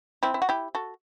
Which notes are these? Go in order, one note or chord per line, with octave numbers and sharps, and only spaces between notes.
C4 E4
E4
F#4
E4 G4
F#4 A4